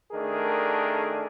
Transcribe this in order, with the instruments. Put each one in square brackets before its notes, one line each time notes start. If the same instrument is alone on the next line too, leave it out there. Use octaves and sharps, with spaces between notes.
[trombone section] D#3 A3 D4 G#4 A#4